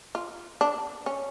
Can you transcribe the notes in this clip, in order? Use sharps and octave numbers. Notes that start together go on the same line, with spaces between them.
F4
D4
C#4